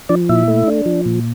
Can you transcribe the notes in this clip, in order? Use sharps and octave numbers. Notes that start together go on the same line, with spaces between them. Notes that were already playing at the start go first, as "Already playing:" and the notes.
F3 D4 D5
A#2 E4 E5
A3
D4
F3
A#2